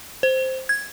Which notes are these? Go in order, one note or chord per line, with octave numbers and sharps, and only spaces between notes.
C5
G#6